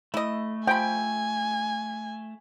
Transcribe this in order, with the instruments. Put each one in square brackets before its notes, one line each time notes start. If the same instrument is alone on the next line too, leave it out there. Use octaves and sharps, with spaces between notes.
[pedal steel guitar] A3 [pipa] E4 D#5
[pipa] F3 B5 [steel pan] G5 [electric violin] G#5